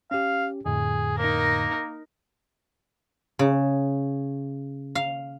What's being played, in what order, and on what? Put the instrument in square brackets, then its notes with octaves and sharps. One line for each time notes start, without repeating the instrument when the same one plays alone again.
[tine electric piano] C#4 G4 [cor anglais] F5
[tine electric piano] F2 A2 D3 [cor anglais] G#4
[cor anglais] A#3 [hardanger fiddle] D#4 A#4
[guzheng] C#3
F5